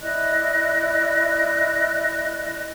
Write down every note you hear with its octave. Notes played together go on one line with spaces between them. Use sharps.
E4 D5 D#5 F#6